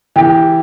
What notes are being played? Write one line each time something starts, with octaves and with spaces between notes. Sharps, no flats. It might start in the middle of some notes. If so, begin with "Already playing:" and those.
E3 G4